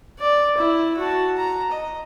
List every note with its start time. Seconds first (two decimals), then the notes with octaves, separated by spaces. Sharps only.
0.19 D5
0.58 E4
0.98 F#4 A5
1.37 A#5
1.72 D#5